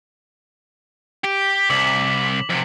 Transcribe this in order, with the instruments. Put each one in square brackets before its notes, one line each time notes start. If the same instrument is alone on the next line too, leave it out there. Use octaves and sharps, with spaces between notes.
[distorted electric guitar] G4
[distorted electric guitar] C2 [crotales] D6 B6 F#7
[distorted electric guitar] F2 C3